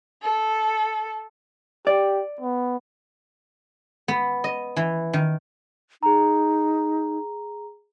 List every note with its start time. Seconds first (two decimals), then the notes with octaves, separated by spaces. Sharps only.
0.22 A4
1.87 G4 D5
2.40 B3
4.08 B3
4.44 D#5
4.76 E3
5.13 D#3
6.03 D#4 G#4 A#5